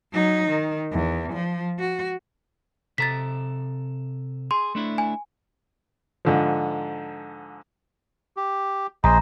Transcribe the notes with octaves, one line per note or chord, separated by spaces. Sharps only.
F#3 D#4
D#3
E2
F3
F#4
C3 A4 A#5 A6 B6
G#4 C6
A3 D4 E4
G#5
G#2 D3 F3
G4
A#1 G#4 C5 D#5 A#5